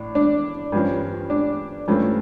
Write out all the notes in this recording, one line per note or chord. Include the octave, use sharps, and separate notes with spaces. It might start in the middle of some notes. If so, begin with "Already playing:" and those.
Already playing: A2 D4
D4
G2 F3 C#4
D4
G2 F3 A3 C#4